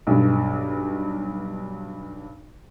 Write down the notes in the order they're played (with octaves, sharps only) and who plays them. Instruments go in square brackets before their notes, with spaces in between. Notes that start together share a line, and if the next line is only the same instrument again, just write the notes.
[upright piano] B1 G2